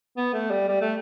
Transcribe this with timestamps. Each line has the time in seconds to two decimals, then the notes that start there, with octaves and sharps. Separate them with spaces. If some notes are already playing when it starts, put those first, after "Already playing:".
0.17 B3
0.33 A3
0.51 G3
0.69 G3
0.81 A3